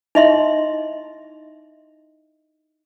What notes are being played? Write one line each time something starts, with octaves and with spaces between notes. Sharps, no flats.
D#4 E4 D#5 E5 C6